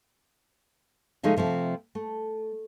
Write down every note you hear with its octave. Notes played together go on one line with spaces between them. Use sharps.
C#3 F3 G#3 A3 D#4
C3 F3 A3 C4
A3